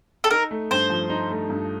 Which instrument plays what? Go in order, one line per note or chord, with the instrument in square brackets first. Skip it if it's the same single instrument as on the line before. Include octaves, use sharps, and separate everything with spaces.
[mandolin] A4
[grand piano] D#4 [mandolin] A#4
[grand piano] A3
[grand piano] G2 [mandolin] C5
[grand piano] F3
D#4
A3
G2